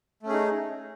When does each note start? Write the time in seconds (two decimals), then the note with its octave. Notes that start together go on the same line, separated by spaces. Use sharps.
0.23 A3
0.26 C#4
0.29 G#4
0.32 D#4